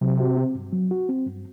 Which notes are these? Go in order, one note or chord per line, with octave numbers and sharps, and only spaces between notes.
C3 F#3
F#4
C4
G2
F#3
F#4
C4
G2